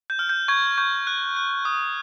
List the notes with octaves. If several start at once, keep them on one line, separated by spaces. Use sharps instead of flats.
G6
F6
G6
C#6 G#6
C#6 G6
F#6
F#6
D#6